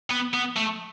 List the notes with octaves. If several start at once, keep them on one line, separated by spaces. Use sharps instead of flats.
B3
B3
A3